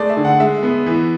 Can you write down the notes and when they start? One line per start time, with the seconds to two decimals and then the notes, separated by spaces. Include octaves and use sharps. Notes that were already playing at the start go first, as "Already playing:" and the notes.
Already playing: G#3 A3 D5
0.10 E5
0.17 D3
0.25 F#5
0.40 G#3 E5
0.63 B3
0.86 E3